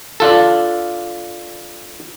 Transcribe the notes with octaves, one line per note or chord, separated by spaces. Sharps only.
D4 F4 A4